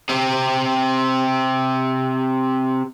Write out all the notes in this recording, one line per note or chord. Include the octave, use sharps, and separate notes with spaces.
C3 C4